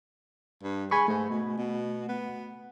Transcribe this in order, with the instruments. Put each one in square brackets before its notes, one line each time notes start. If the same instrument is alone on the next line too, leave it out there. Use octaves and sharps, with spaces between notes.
[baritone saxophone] G2
[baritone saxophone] G#3 [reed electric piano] G#5 B5 C#6
[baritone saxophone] G#2 [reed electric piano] A3
[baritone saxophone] B2
B2
B3